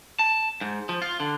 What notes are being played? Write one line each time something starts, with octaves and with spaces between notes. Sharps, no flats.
A5
G#2
F3
F4
D3